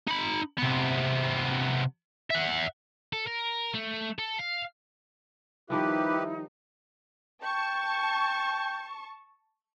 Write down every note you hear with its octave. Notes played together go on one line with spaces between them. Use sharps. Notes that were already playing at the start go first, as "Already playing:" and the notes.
D#4 B5
C3 B3
E5 F#5
A4
A#4
A3
A4
F5
D#3 F3 G3 D#4 E4 G4 B4
G5 A5 C#6